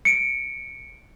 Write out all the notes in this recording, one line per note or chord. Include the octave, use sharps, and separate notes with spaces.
C#7 D7